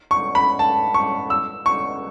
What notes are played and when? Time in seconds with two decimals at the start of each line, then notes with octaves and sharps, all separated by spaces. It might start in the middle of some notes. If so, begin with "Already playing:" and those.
0.11 C#6
0.35 B5
0.59 A5
0.94 C#6
1.30 E6
1.66 C#6